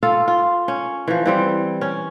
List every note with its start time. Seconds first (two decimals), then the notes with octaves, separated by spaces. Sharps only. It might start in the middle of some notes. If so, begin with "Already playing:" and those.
0.03 F4 A4 F5
0.28 F4
0.68 C#4
1.08 E3 F3
1.26 E3 G3 C4
1.81 C#4